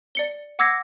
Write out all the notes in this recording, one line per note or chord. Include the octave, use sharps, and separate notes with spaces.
D5 C#7 G7
F#5 D6 E6 G#6 A#6 C7